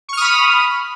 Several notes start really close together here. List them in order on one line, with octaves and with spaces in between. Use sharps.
C#6 F6 D#6 B5